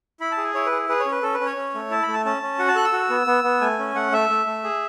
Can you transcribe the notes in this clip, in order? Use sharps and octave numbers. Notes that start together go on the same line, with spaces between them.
E4 B5
A5
G#4
G#5
E4 C#5
B4
G#4
G#4 B4
C#5
C#4
B4
C#4 A4
B4
C#4
C#5
C#4
A3
E4 A5
A3 B5
A5
C#4 A5
C#4
F#4 F#5
A5
A4 F#6
E6
F#4
B3
B3
B3
A3 G#5
C#4
A3 F#5
A3 E5
A3
A3
G#4